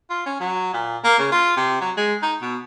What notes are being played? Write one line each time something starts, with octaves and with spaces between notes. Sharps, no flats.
F4
C#4
F#3
A#2
A#3
C#3
F4
C3
F#3
G#3
D#4
B2